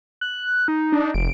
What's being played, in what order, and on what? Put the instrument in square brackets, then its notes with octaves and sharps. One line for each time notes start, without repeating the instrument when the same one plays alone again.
[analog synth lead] F#6
D#4
[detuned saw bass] D4
[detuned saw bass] F1 [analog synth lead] D7